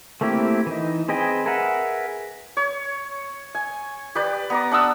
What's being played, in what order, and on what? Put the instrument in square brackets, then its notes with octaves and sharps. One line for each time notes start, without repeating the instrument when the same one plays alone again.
[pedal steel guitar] A3 A#3 C4 E4 G4
E3 D#4
C4 G#4 B4 D#5 G5
G#4 A#4 B4 E5 F#5
[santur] C#5
G#5
G4 B4 D5
B3 A#5 D6
D4 F#5 D#6 E6